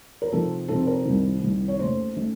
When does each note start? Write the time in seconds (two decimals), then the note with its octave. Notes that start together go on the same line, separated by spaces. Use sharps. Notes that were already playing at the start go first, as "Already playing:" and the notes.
0.22 A#4
0.32 C3 F3 C4 D#4 A4
0.68 C3 F3 C4 D#4 A4
0.82 A4
0.87 A#4
1.05 C2 C3 D#3
1.42 C2 C3 D#3
1.68 C#5
1.79 D#2 D#3 A3 C#4 C5
2.17 D#3 A3 C#4